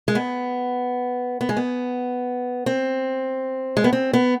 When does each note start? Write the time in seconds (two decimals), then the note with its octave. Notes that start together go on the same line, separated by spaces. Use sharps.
0.08 G#3
0.15 B3
1.41 B3
1.49 G#3
1.57 B3
2.66 C4
3.77 G#3
3.84 B3
3.93 C4
4.13 B3